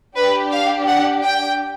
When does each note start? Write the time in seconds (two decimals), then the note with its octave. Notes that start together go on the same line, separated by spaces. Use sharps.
0.17 D4 G4 B4
0.52 F5
0.87 F#5
1.23 G5